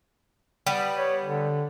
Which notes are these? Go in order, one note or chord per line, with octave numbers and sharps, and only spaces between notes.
G3 B3
C#5
D3